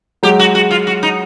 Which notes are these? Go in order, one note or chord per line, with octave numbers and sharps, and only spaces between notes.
F#3 G#3 G4
F#4
F#4
F4
F#4
D#4